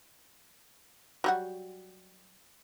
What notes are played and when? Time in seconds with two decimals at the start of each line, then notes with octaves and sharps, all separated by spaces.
1.24 F#3 G3 F#4